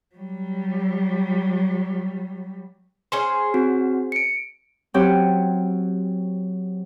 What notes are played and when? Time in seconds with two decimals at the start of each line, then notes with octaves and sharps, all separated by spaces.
0.16 F#3 G3
3.12 C#4 G#4 C5 C6
3.54 C4 F#4
4.12 C#7 D7
4.94 F#3 C4 C#4 G4